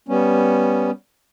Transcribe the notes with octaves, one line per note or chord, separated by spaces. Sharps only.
G3 B3 C#4